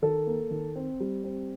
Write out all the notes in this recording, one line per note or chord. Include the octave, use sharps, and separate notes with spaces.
D#3 A4
A#3
D#3
C4
G3
C4